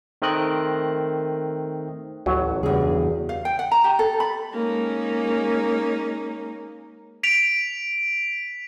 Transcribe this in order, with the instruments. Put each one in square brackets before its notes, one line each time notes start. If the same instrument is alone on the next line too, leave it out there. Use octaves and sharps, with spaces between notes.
[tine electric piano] D#3 A3 C4 A#4 D#5 F#6
[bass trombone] A1 [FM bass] D2 [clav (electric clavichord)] F#3
[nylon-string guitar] E2 G#4 [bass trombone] G2 [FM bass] C#3
[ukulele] F5
G5
F#5
A#5
G4
A4
B5
[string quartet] G#3 A#3 C#4 D#4
[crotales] B6 D7 F7